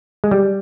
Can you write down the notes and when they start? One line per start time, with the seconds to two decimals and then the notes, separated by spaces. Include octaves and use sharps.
0.24 G#3
0.31 G3